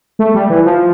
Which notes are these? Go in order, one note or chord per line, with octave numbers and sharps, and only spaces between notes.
A3
G3
E3
F3